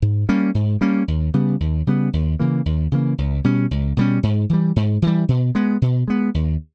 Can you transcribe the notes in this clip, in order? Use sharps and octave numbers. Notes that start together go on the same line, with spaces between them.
G#2
G3 A#3 C#4
G#2
G3 A#3 C#4
D#2
C#3 G3 B3
D#2
C#3 G3 B3
D#2
C#3 E3 A#3
D#2
C#3 E3 A#3
C#2
B2 G3 C#4
C#2
B2 G3 C#4
G#2
E3 G3
G#2
E3 G3
B2
G#3 B3
B2
G#3 B3
D#2